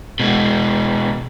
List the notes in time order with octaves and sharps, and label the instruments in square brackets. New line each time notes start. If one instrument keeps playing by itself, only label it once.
[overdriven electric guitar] B2 G#3